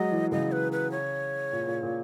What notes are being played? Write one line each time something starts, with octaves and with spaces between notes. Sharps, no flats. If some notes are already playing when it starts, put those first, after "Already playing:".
Already playing: F#3 G#3 D#5
E3
C#3 D#5
B4
B4
C#5
A#2
A#2
A#2